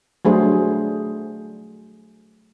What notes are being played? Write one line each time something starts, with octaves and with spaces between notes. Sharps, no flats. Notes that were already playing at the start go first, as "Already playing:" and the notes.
F#3 G3 A3 D4 G#4 C5